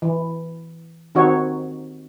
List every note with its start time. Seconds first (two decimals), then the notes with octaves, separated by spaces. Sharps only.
0.02 E3
1.15 D#3 C4 D#4 F#4 C#5